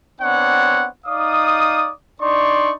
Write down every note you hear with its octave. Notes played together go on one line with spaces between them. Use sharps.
B3 C4 D4 C#5 F#5
D#4 D5 F5 D#6
D4 D#4 D5 C6 C#6